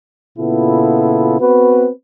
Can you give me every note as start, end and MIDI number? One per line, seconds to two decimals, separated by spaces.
0.38 1.40 46
0.38 1.40 49
0.38 1.40 59
0.38 1.40 64
0.38 1.40 65
0.38 1.40 69
1.40 1.88 59
1.40 1.88 60
1.40 1.88 66
1.40 1.88 71